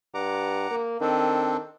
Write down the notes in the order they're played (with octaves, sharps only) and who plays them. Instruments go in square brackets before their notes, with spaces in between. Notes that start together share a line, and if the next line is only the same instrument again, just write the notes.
[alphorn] G2 [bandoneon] F#5 A#5 D6
[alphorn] A#3
[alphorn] D#3 [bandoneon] C4 D4 A4